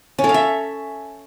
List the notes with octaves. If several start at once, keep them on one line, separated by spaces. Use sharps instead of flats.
C#4
A4
F5
E5